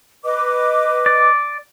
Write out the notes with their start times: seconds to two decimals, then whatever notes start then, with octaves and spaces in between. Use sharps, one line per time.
0.24 B4 D#5 D6
1.06 D5